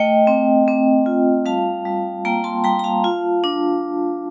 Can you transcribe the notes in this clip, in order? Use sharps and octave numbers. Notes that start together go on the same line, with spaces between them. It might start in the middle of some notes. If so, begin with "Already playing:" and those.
Already playing: A3 D#5 G5
C4
C4
F4
G3 F5 A5
G3
A#3 G5 A#5
A5 C6
G3 G5 A#5
A#5
F5 A5
F4
D4